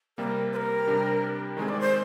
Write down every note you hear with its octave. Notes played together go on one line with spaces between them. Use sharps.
C3 G3 A#3 A#4
C5
A#4
C3 G3 D4 G4
D#3 G#3 C4 G#4
D5
C5